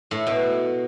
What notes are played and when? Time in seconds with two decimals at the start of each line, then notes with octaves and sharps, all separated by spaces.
0.11 A2
0.27 B2